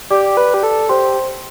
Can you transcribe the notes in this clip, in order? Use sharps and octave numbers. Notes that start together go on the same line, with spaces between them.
G4 D5 D6
B4
G4
A4
G4 C5 C6